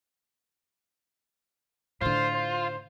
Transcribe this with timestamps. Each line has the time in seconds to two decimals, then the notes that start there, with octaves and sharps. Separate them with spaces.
2.01 A2 D3 F4 C5
2.34 C5